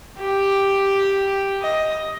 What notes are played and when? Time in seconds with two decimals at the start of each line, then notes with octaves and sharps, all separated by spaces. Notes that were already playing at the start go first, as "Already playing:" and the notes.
0.20 G4
1.62 D#5